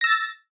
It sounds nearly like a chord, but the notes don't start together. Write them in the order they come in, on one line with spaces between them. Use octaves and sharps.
A#6 E6 A6